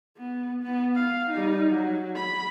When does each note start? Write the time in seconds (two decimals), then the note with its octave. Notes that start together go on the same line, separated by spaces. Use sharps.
0.17 B3
0.63 B3
0.95 F5
1.30 G3 D#4
1.70 F#3
2.16 B5